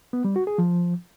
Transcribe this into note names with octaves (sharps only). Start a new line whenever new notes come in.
B3
G3
F#4
G#4
F3